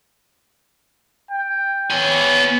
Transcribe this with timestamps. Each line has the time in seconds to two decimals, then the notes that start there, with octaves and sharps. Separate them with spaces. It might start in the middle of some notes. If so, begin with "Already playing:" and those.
1.31 G5
1.90 B3 C#5 G#5